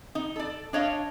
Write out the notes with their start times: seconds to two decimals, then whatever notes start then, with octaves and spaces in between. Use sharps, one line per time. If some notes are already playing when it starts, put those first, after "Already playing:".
0.15 D#4
0.36 A4 D5
0.73 D4 C#5 D#5 F5